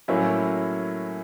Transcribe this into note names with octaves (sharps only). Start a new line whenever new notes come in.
A2 F#3 A#3 C#4 E4